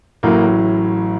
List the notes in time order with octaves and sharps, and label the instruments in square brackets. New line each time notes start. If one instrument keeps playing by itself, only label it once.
[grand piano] A1 A2 F#3 A#3